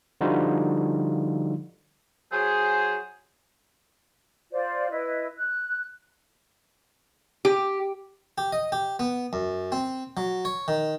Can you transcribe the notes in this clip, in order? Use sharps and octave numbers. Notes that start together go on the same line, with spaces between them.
D3 F3 G3 D#4 F4 F#4
F#3 G#4 C5
F4 C5 D5
E4 B4 D#5
F#6
G4
G4
D#5
G4
B3
F#2
C4
F#3
C#5
D#3